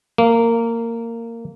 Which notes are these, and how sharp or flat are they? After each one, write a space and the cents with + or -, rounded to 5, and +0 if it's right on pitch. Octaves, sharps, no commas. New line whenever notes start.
A#3 -15